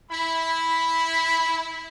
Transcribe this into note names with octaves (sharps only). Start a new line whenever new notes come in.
E4 B5